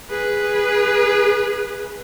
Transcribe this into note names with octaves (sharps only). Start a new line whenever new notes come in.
G#4 B4